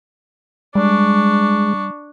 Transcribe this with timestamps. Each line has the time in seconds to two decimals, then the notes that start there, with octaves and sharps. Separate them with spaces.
0.75 G3 G#3 D4 C#6